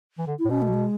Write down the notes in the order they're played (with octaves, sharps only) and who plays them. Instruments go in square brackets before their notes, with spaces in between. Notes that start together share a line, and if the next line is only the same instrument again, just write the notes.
[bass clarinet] E3
D3
[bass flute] E4
[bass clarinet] A2
[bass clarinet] B2 [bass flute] C#4
[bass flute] A3
F#3
G#3